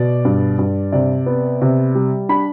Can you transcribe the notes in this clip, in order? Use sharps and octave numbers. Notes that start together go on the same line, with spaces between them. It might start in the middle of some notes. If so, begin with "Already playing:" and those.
Already playing: B2 D5
G2
G2
C3 D5
B3
C3
G3
D4 B5